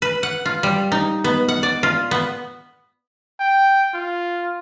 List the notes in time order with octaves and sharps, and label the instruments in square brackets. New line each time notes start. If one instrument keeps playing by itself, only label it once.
[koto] B4
F#5
F4
G3
D#4
B3
F#5
D5
F4
B3
[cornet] G5
F4